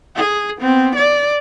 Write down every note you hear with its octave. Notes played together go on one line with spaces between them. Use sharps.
G#4
B3 C4
D5